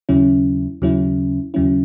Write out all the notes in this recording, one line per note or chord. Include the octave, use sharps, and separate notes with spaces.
D#2 C#3 F#3 C#4 E4
D#2 C#3 F#3 C#4 E4
D#2 C#3 F#3 C#4 E4